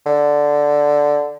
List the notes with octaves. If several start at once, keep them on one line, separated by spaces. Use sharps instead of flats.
D3